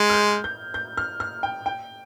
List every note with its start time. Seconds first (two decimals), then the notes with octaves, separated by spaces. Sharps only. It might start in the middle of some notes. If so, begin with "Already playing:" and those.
Already playing: G#3
0.10 F6
0.13 G6
0.44 G6
0.74 G6
0.97 F6
1.20 F6
1.43 G5
1.66 G5